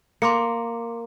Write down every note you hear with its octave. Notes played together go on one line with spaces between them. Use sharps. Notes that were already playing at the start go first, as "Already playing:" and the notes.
A#3 C6 D6 C#7